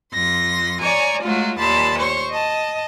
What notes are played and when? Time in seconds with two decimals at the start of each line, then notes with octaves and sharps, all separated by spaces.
0.13 F2 C6 A#6
0.80 C#5 D5 G#5 A#5
1.22 F#3 G#3 A3 F4
1.58 D#2 A#2 A5 B5 C6
1.98 C5 C#5 C#6
2.30 D#5 A5